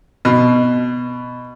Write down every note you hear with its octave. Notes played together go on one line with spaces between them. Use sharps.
B2